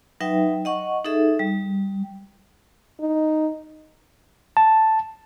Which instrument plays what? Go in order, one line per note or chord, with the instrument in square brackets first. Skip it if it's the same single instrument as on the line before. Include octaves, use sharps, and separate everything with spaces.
[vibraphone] F#3 D#4 B4 E5 G5
D#5 F#5 C#6
D#4 G#4 A4 E5
G3
[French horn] D#4
[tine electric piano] A5